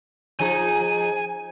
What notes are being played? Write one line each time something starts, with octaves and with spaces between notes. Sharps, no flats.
F3 D#4 G#4 G#5